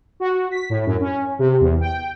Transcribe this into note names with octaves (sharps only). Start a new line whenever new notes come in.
F#4
B6
A2
F#2
C#4
C3
E2
G5